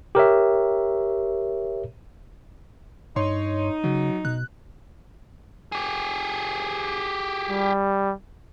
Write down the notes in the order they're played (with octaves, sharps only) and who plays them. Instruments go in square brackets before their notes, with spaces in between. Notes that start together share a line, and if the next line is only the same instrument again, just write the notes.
[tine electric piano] G4 A#4 C#5 E5
[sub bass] G2 [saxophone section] D#4 [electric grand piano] C#5 C6
[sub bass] C#3 [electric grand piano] F#3
[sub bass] B2 [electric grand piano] F#6
[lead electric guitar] G4 G#4
[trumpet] G3